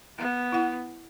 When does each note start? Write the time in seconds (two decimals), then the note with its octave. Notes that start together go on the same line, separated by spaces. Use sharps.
0.18 B3
0.52 E4 F#5